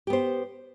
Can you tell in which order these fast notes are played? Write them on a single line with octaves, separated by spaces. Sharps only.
G4 B3 C5